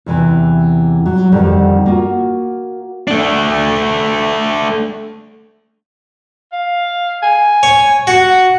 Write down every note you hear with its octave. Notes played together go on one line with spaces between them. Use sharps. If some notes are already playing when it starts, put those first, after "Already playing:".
E2 C3 E3
F#3
F2 D3 D#3 G3
A#3 F4 F#4
A3 D4
F5
G#5
C#5
F#4 F#5